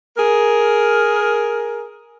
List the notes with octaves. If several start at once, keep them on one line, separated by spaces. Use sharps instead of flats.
G#4 A#4